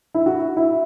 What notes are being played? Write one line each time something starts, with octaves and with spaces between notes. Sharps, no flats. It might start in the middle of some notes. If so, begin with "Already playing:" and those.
E4
F#4
E4